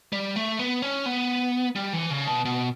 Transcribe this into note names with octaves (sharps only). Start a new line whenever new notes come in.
G3
A3
B3
C#4
B3
G3
E3
C#3
B2
B2